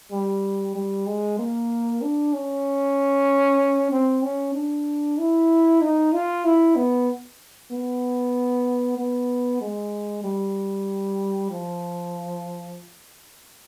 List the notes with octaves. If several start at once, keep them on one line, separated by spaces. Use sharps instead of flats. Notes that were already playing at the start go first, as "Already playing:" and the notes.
G3
G3
G#3
A#3
D4
C#4
C4
C#4
D4
E4
D#4
F4
E4
B3
B3
B3
G#3
G3
F3